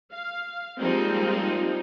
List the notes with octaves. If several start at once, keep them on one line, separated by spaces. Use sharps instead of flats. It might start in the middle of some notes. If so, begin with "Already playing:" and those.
F5
F3 G3 G#3 A#3 C4 D#4